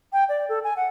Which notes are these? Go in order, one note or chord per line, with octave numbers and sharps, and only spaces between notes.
G5
D5
A4
G#5
F#5